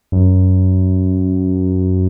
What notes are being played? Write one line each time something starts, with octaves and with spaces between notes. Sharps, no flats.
F#2